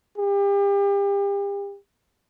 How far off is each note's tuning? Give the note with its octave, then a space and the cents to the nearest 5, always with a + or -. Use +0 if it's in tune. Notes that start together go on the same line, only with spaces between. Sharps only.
G4 +35